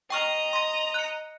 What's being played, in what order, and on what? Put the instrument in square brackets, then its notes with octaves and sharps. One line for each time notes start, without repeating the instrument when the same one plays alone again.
[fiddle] D#5 A#5 [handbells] G5 C#6 F6
[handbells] C6 A#6
F#6 C#7